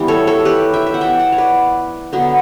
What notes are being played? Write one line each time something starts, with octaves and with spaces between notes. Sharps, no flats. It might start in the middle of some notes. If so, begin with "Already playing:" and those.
Already playing: E3 G3 B3
A4 C#5
A4 C#5
G4 B4
E5 G5
E5
F#5
E3 B3 E5 G5
F#5 A5
C#5
B4 D5
D3 F#3 B3